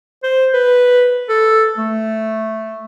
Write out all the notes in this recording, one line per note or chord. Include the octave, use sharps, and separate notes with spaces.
C5
B4
A4
A3